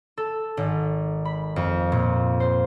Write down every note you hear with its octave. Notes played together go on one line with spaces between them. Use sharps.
A4
G#1
B5
F2
A#2
C5